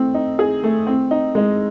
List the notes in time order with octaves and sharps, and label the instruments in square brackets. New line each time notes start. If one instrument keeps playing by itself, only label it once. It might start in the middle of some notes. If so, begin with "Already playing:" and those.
Already playing: [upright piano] A3 C4
D#4
G#4
A3
C4
D#4
G#3